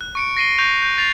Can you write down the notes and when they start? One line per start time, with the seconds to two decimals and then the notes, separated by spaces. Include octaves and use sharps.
0.01 F#6
0.15 C#6 C#7 D7
0.36 A#6 C7 D#7 G7
0.58 C#6 G6 A#6 F7
0.82 G6
0.98 A6 C7 F7